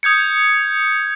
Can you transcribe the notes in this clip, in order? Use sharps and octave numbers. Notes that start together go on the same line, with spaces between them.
D#6 G6 G#6 C#7